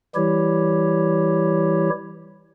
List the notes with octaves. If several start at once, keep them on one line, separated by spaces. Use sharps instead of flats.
E3 G3 E4 G4 C#5